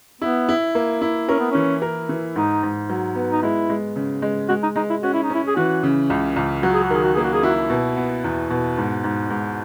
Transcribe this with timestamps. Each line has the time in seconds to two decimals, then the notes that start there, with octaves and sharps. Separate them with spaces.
0.21 B3 E4
0.49 E4
0.75 A#3
1.02 E4
1.28 C#4 A#4
1.40 B3
1.51 E3 C#4
1.82 A#4
2.09 E3
2.35 G#2 D#4
2.63 G#2
2.89 F#3
3.15 B3
3.32 D#4
3.43 G#3 E4
3.69 G#3
3.96 C#3
4.22 G#3
4.49 G#3 F#4
4.63 D#4
4.76 G#3 D#4
4.90 E4
5.03 C#4 F#4
5.13 E4
5.23 D#4
5.30 C#4 E4
5.47 G#4
5.56 E3 F#4
5.83 C#3
6.10 C#2
6.36 C#2
6.63 F#3 F#4
6.74 G#4
6.83 F#4
6.90 D#3 G#4
7.03 F#4
7.14 A#3 G#4
7.24 F#4
7.33 G#4
7.43 E4 F#4
7.70 B2
7.97 B3
8.24 E2
8.50 B2
8.77 G#2
9.04 G#2
9.30 G#2